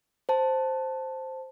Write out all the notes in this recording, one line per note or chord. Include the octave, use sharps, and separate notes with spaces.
C5 A5